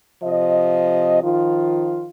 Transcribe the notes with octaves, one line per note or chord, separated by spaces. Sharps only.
C3 F3 D#5
D#3 F3 F4